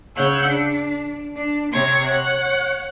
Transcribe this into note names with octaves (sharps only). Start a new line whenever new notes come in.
C#3 C#5 F#5 E6 F#6 G6
D4
D4
C3 C4 C#5 C#6 G#6 A#6
C#5 F#5